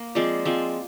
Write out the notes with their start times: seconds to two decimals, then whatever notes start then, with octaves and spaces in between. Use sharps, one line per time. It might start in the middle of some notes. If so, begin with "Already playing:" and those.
Already playing: A#3
0.15 F3 G#3 C4 D5
0.45 F3 G#3 C4